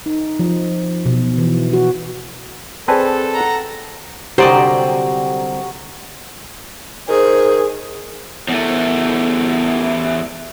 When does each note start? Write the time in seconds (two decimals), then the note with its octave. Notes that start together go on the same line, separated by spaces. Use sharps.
0.06 D#4
0.39 F3
1.05 B2
1.38 E3
1.73 F#4
2.88 C4 G#4 A4 B4 D5 G#5 A5
3.33 F#5 A#5
4.38 C2 D3 F#3 G4 C5 D5 D#5
7.09 D#3 G#4 C5
8.48 E2 A3